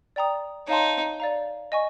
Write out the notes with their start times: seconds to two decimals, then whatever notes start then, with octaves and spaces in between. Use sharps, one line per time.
0.16 D5 G5 A#5 D#6
0.68 D#4 C#5 F5 A5 C6
1.20 D5 F5 A#5
1.72 D#5 G#5 C#6